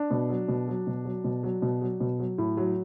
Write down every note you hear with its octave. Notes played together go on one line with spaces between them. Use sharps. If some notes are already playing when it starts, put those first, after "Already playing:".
Already playing: D4
B2
F#3
B2
F#3
B2
F#3
B2
F#3
B2
F#3
B2
F#3
A2
F#3